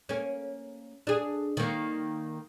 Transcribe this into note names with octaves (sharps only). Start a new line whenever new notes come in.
A#3 C#4
D4 G#4
D#3 A#3